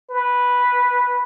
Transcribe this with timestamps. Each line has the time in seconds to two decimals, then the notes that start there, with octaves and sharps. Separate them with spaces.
0.11 B4